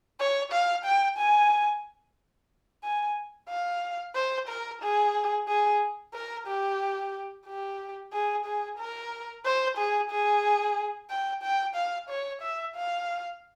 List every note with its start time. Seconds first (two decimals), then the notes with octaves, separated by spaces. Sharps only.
0.19 C#5
0.53 F5
0.85 G5
1.18 G#5
2.84 G#5
3.49 F5
4.15 C5
4.49 A#4
4.82 G#4
5.48 G#4
6.14 A#4
6.47 G4
7.46 G4
8.13 G#4
8.45 G#4
8.79 A#4
9.45 C5
9.78 G#4
10.11 G#4
11.10 G5
11.43 G5
11.75 F5
12.09 C#5
12.42 E5
12.75 F5